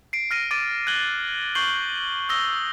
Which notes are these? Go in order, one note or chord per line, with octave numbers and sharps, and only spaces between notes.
C7 D7
F6 A#6 D#7
D6 A6 D7 D#7
F#6 G#6 F#7 G7
C#6 G6 C7 F#7 G7
D#6 E6 A#6 G7